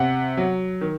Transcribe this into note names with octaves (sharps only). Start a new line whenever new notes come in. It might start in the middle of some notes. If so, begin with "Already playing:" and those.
Already playing: C3 F#5
F#3
D#3